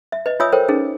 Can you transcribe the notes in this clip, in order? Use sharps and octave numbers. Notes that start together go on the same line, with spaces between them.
E5
B4 D#5
F4 C#5 E5 G#5 D#6 E6
A4 A#4 C5 C#5 G5
C#4 D#4 G#4